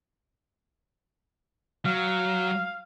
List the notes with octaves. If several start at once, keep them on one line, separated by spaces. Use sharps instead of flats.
F#3 F5